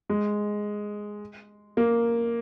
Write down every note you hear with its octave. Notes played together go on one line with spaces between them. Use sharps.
G#3
A#3